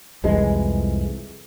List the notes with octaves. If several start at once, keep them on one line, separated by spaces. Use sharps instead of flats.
C2 F2 E3 G#3